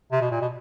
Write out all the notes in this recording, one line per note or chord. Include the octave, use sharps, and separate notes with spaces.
C3
B2
A#2
B2